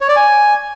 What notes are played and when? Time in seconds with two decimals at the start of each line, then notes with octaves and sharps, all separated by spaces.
0.01 C#5
0.09 D5
0.16 G#5